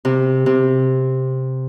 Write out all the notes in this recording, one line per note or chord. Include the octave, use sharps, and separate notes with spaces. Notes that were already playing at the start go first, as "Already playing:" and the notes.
C3
C3